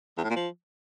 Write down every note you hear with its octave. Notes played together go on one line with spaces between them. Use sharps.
E2
A2
A#2
F3